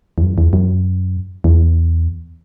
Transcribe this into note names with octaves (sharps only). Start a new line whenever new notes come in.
E2
F#2
E2
F#2
E2